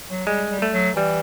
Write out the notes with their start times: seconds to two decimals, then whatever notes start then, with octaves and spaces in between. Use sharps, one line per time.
0.11 F#3
0.27 G3 G#3
0.50 G3
0.62 A3
0.73 F#3
0.96 E3 G3